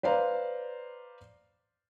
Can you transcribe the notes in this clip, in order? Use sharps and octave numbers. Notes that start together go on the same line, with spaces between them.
B4 C5 D5 F5 A#5